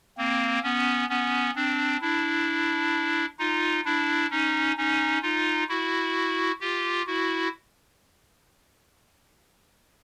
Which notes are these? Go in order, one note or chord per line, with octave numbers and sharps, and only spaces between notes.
A#3 C4
B3 C#4
B3 C#4
C4 D4
D4 E4
D#4 F4
D4 E4
C#4 D#4
C#4 D#4
D#4 F4
E4 F#4
F4 G4
E4 F#4